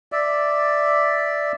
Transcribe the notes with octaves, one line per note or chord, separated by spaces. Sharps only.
D5 E5